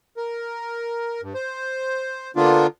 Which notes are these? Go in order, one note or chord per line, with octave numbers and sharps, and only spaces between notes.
A#4
G2
C5
D3 A#3 B3 D4 F4